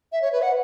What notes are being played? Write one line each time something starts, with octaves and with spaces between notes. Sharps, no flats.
E5
C#5
B4
F#5